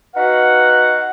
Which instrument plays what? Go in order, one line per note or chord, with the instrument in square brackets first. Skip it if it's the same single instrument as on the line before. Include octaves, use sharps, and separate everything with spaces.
[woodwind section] D#4 F#4 B4 F5 F#5